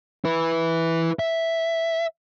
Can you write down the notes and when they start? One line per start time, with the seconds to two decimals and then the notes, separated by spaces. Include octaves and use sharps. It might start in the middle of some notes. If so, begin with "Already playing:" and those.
0.25 E4 B4
1.19 E5